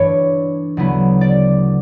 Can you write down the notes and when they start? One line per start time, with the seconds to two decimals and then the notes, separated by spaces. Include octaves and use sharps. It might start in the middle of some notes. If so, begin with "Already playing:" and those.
Already playing: G2 E3 A3 D4 C#5
0.77 D2 C#3 F#3 B3 E4
1.21 D5